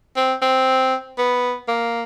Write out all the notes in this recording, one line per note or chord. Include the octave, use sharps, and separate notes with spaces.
C4
C4
B3
A#3